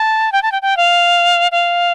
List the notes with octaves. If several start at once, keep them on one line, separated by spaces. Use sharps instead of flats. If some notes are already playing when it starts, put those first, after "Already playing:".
Already playing: A5
G5
A5
G5
G5
F5
F5